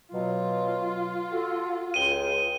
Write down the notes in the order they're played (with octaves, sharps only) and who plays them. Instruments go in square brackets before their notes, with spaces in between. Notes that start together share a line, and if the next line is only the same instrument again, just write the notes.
[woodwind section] B2 F#3 [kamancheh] F4
[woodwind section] F#4 A4
[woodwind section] C#2 G#4 G5 [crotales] D#7 G7